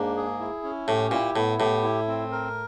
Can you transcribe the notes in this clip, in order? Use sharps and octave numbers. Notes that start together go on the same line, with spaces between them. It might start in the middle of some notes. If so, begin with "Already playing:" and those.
Already playing: G#2 A#3 D4
G#4
E4
C#4
A2 G4
A#2 E4
A2 B3
A2 G4
E4
C4
A#4